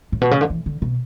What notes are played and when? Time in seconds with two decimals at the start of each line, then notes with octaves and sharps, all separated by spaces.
0.12 A2
0.21 B2
0.31 C#3
0.41 D3
0.50 E3
0.66 D3
0.82 B2